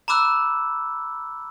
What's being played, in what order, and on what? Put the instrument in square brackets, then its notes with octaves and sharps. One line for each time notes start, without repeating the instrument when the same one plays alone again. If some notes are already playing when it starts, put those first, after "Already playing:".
[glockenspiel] A#5 B5 D6 E6 F#6